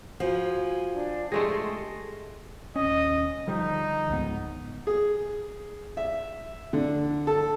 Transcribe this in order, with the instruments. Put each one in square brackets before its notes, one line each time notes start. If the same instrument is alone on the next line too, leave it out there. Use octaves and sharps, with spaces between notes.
[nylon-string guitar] F3 [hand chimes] F4 F#4 [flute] G#5
[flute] D4
[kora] G#3 A3 G#4 [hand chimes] G4 A5 A#6 [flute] C6
[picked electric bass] D#1 C#4 [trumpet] D#5
[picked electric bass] D3 F3 G3 [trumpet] D#4
[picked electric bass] C#2 G#2 B3
[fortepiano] G#4
E5
D3
A4